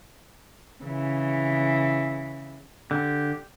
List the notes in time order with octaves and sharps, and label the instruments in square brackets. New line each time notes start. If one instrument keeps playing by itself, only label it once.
[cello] C#3 E3
[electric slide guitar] D3 [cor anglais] G4